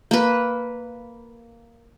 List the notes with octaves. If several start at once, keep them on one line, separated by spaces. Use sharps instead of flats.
A#3 B4